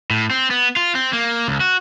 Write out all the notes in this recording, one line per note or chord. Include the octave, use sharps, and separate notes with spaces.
A2
C4
B3
F4
C4
A#3
C#2
F#4